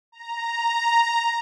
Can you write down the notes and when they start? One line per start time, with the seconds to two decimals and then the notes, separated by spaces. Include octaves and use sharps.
0.12 A#5